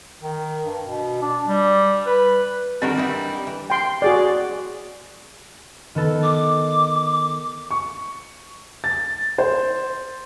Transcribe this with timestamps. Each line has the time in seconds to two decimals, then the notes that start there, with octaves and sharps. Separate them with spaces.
0.23 D#3
0.65 G2
0.85 B2
1.22 D4
1.47 G3
2.06 B4
2.82 D#3 G3 C4 D4 F#4 A#4
2.97 E3 D#4 E4
3.47 E3
3.70 G5 C6
4.02 F#4 G#4 D5
5.95 D#3 B3 A4
6.23 D6
7.71 C#6
8.84 A6
9.38 C5